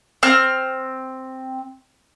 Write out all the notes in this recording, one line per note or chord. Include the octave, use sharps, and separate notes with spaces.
C4 F6